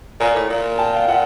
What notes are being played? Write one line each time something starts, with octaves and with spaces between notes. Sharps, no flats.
A#2 G#5 A#5
A2
A#2
G5 A5
F5 G5
A#2 E5 F#5